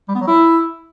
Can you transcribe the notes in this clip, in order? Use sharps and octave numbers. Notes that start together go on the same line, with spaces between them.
G3
B3
F#3
E4